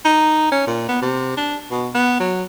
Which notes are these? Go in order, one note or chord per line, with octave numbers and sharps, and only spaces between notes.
D#4
C#4
A#2
B3
C3
D4
B2
B3
F#3